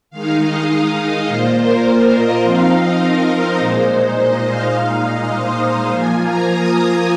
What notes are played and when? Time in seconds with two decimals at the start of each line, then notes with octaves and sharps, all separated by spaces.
0.10 D#3 G#3 D#4 F5
0.40 D#5
1.27 A#2 A#3 F4 C5
1.56 A#4
1.84 C5
2.14 D#5
2.42 F3 C4 D#4 F5
2.72 D#5
3.01 A#4
3.29 C5
3.59 A#2 G#3 D#4
4.17 D#5
4.45 F5
4.74 A#2 G#3 D#4
5.03 D#5
5.32 C5
5.62 F5
5.90 F3 A#3 F4 G#5
6.19 A#5
6.48 D#6
6.77 D#6